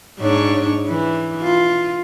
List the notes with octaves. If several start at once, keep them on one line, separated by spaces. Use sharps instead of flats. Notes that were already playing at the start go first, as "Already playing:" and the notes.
G#2 D4 C#5
E3
F4